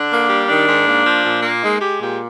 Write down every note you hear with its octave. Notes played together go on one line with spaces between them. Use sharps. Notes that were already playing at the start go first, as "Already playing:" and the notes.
Already playing: D3 D4
A#3
G3
D#3 D4
G#2
A#3
F3
A#2
A#3
G#3 D#4
G#3 G4
A#2 G4